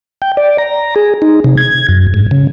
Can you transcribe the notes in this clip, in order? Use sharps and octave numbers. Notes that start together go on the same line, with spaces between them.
G5
D5
A#5
G#4
D#4
C3
G#6
F#2
G#2
C#3